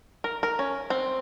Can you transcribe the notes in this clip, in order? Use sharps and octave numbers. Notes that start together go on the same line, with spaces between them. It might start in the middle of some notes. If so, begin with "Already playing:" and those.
A#4
A#4
C#4
C4